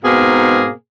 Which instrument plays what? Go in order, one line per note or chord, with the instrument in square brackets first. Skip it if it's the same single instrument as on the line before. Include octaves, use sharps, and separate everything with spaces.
[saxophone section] G#2 B2 A#3 C4 G#4